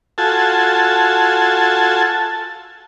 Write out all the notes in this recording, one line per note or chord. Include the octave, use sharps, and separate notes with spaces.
F4 F#4 A4 G#5 A5